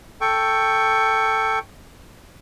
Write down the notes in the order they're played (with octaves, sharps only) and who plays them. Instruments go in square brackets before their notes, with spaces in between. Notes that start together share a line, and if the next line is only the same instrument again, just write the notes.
[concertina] A4 G5 C#6